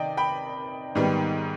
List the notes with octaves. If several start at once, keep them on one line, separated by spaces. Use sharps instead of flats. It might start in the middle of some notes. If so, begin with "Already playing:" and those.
Already playing: C3 D#3 D5 D#5 G5
G5 B5
G#2 D#3 G3 B3